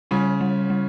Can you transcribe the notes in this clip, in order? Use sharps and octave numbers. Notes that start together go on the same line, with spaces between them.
C#3 G3 C#4
G3
G3